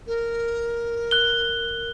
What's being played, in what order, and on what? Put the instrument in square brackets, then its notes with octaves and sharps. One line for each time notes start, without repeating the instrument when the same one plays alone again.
[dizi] A#4
[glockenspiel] F#6 G7